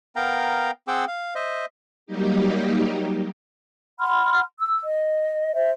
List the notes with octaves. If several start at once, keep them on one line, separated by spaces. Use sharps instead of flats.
B3 A#4 F5 G5 A#5
C4 G#4 F#5 G5 D6 E6
F5
C5 D#5 E5
F#3 G3 A#3 D#4 G4
F#5 B5 C6 F6
E6
D#5
C5 E5